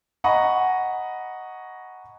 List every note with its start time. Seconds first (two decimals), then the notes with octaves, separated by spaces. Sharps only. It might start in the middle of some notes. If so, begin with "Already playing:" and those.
0.24 D#5 F#5 G#5 A#5 B5 C#6